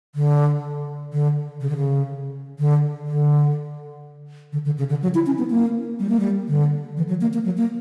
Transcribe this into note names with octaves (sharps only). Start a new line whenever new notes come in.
D3
D3
C#3
D3
C#3
D3
D3
D3
D3
C#3
D3
F#3
E4
C#4
B3
A#3
G3
A#3
G3
D3
E3
F#3
A#3
A#3
F#3
A#3